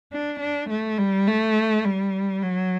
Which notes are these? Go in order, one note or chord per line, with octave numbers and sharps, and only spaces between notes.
D4
D4
A3
G3
A3
G3
F#3